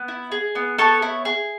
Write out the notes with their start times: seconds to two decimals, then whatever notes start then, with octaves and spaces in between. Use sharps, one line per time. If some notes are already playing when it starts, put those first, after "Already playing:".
Already playing: B3
0.08 E4
0.32 G#4
0.55 B3
0.78 B3 A4 C#5
1.02 E4
1.25 G#4